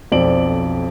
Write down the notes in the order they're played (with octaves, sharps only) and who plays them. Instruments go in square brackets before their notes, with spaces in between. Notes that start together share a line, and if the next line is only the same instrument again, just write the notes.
[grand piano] B1 F2 C4 D5 D7 F#7